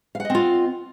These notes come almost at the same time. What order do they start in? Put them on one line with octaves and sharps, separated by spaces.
F5 F#5 D#5 C4 F4